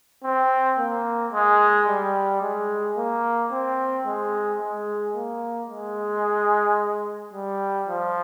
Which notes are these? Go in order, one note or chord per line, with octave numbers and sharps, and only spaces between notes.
C4
A#3
G#3
G3
G#3
A#3
C4
G#3
G#3
A#3
G#3
G3
F3